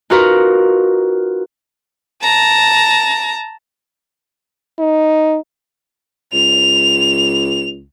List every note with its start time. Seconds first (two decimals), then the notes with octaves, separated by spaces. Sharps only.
0.10 D#4 F4 F#4 A#4 B4
2.22 A5 A#5
4.79 D#4
6.33 C#2 F7